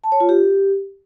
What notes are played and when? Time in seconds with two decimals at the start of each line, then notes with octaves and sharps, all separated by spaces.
0.04 A5
0.12 C#5
0.20 F4
0.29 G4